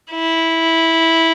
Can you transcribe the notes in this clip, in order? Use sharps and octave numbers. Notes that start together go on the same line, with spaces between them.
E4